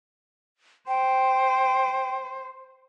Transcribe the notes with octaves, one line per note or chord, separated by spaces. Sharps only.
C5 G5